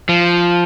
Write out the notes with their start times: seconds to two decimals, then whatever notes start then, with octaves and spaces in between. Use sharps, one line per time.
0.09 F3